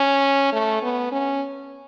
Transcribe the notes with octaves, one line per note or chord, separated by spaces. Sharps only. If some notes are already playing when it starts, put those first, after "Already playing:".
Already playing: C#4
A3
B3
C#4